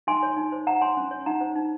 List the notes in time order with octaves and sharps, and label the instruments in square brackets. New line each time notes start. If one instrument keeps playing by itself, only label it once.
[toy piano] D#4 G#5 C6
C#5
D#4
C5
D#4 F#5 A#5
C#5 G#5 C6
C#4
C#5
D#4 F#5 A#5
C5
D#4